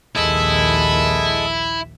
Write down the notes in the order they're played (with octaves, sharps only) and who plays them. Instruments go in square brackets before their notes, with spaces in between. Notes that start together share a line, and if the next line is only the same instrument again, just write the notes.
[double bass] A#1 D#2 [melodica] G#3 A4 D#6 [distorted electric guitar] E4 [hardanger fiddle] E5